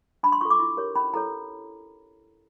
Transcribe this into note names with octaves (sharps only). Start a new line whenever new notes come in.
D4 B5
C6
F4 A4 C#6
D6
E4
G4 A#4 C#5
C#4 B5
E4 A4 C#5 A#5